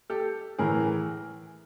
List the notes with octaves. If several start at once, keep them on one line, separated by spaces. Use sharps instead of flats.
G4 A4
A2 E3 G#4 A#4